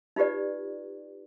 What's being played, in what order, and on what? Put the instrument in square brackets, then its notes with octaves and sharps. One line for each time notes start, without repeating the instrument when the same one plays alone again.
[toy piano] D#4 F4 G4 B4 D5